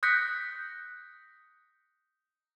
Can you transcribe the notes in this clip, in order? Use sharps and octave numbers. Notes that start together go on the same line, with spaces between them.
D#6 F#6 G6 A#6 B6 C#7